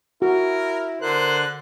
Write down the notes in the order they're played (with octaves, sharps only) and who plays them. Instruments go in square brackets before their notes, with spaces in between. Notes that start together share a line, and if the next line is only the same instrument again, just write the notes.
[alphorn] E4 [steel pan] F#4 [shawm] A#4
[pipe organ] D3 F#6 [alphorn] A#4 [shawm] C5